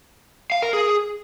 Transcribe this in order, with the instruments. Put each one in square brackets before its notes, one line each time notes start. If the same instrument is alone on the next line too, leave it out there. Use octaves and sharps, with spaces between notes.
[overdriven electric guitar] F5
A#4
G#4